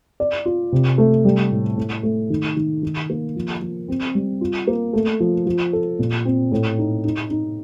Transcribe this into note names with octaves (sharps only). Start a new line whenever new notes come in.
D5
F4
C3
A3
G3
A2
A2
A3
D#3
D#3
D#3
A#3
F3
F3
C4
G3
F4
A#3
A3
F3
F3
A4
A#2
C4
A2
D#4
D#4
D#4